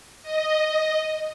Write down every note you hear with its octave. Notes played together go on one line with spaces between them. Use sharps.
D#5